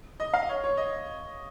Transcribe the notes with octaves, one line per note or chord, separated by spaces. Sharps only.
D#5
F5
C#5
C#5
D#5